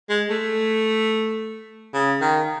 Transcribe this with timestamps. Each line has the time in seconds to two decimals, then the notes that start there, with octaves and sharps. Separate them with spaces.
0.09 G#3
0.30 A3
1.94 C#3
2.21 D#3